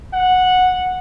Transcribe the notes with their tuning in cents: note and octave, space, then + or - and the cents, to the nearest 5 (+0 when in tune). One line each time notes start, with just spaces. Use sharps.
F#5 -10